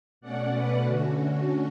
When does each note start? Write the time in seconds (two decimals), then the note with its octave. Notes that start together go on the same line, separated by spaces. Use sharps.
0.21 B2 A3 C#4 D5 F#5
0.52 B4 D5
0.83 D3 A3 C#4 F#4